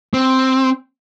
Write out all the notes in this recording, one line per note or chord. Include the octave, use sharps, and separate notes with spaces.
C4